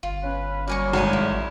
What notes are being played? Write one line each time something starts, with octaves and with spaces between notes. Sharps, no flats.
G1 F4
C#4 B4
F#3 G3 A#3 D5 G#5 C#6
G#1 F#4 G#5 D#6
A1 E4